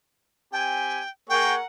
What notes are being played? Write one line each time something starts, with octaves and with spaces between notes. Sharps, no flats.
C4 G4 G5 G#5
A#3 G#4 A#4 C#5 F#5 G5